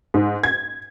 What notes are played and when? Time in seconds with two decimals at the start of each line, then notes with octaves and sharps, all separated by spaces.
0.14 G#2
0.43 G#6